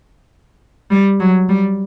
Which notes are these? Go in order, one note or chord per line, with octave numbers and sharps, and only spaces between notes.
G3
F#3
G3